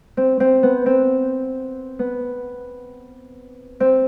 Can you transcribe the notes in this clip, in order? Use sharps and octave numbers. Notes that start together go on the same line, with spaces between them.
C4
C4
B3
C4
B3
C4